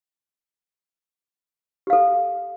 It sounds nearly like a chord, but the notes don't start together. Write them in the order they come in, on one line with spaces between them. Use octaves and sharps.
G4 F5 A4